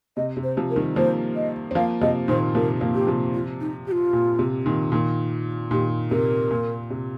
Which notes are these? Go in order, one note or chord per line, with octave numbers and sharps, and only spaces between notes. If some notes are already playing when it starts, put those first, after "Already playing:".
C3 D#5
C3
C5
C3 F3
A#4
D#3 G3
F3 A#3 C5
D#5
C4
F3 A#3 F5
C3 F3 D#5
A#2 D#3 C5
C3 F3 A#4
F3 A#3
G4
C3 F3
F4
D#4
G4
F4
A#2
C3
A#2 D#3
A#2 D#3
A#2 D#3 G4
C3 A#4
A#2
C3